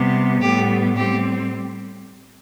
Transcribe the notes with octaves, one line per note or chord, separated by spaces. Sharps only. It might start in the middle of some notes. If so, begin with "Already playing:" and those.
Already playing: C3 G3 B3
A2 G3 B3 G4
A2 G3 C4 G4